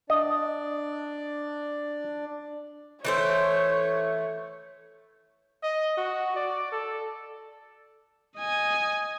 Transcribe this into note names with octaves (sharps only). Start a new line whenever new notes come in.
D4 D5 D#5
E3 A3 C5 C#5
D#5
F#4
D5
A4
D#5 G#5